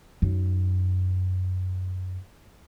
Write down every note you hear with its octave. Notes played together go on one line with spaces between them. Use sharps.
F#2 D#4